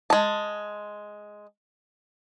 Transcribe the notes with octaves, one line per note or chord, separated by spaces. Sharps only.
G#3 A5